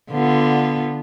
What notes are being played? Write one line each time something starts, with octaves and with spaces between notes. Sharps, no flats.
D3 B3 F4